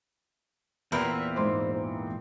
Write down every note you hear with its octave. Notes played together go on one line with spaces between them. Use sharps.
E2 A#2 B3 C4 E4 A#4 B4 G6
G#2 C5 C6 D6
E3